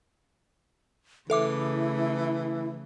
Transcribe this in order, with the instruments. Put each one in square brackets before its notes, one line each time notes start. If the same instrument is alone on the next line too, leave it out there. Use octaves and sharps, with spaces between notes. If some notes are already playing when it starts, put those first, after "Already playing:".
[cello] C#3 A3 [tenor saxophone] E3 [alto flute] E4 [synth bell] A4 E5 D6